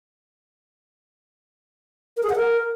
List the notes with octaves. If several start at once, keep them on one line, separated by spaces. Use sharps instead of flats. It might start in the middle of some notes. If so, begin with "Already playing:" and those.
A#4
G#4
F#5
A#4